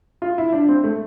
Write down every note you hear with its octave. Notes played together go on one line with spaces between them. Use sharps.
F4
E4
D4
C4
A3